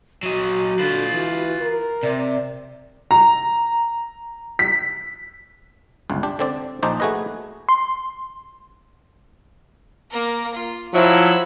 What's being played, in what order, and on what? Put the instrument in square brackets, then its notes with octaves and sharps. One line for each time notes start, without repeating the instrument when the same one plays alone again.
[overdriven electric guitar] F#3 D#5 [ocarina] F#4
[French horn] D3 [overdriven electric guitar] F4 B4
[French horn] E3
A#4
[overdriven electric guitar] C3 [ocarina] D5
[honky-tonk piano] A#5
B6
[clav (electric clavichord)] G1 C#2
D4 G4
D3 C4 D5
A#1 D4 D#4 C5 D5
A3 F#4 G#4 B4 D#5
[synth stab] C6
[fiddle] A#3 A#4
F4
[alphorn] F3 [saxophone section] F#3 E4 [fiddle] B5 E6